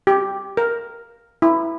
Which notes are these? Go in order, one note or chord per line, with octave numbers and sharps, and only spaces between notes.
G4
A#4
E4